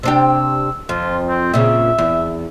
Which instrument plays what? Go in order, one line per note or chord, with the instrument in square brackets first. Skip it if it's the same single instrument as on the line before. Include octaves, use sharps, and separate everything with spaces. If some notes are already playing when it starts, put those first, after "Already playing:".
[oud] C3 D4 G4 [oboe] E6
[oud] F2 [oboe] F4
[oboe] C4
[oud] A#2 C#3 [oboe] E5
[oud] E2